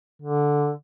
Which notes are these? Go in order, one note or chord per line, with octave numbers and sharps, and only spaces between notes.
D3